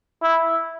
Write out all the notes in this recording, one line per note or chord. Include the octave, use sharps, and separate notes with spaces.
E4